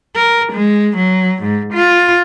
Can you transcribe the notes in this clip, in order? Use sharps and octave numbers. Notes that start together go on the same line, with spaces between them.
A#4
G#3
F#3
G#2
F4